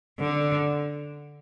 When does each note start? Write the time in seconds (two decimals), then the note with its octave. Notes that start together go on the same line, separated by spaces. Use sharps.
0.19 D3